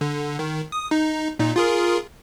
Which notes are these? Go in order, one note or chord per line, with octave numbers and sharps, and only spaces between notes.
D3
D#3
D#6
D#4
A#2 D#4
F4 G#4 A#4